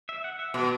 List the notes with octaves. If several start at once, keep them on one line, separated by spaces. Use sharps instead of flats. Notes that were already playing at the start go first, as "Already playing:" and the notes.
E5
F#5
E5
B2